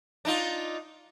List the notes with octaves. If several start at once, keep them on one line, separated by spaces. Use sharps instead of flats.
D4 D#4 F4